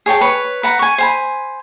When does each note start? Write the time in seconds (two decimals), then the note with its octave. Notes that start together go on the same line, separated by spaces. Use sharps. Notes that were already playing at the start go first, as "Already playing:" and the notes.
0.06 G#4 C#5 G5 A5
0.21 B4 C#5
0.63 B4 F#5 A#5
0.79 G#5 C#6
0.98 C5 G#5 B5